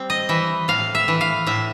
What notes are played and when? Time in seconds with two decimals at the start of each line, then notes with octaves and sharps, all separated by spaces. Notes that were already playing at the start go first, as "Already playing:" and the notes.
Already playing: G3 C4
0.10 D#5
0.29 E3 E5
0.68 A2 F5
0.95 E5
1.08 E3
1.21 F5
1.47 A2 E5